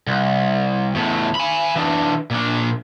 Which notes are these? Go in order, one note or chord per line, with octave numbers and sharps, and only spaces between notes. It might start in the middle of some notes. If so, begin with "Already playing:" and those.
C2
E2 A2
G#5 B5
E3 D4
A#2 D4